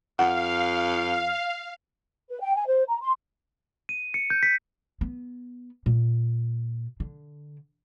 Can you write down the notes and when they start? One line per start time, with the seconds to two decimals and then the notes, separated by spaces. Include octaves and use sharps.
0.19 F2 F5 F#5
2.29 B4
2.41 G5
2.55 G#5
2.67 C5
2.88 A#5
3.01 C6
3.89 D#7
4.14 C#7
4.30 G6
4.43 B6
5.01 B3
5.86 A#2
7.00 D3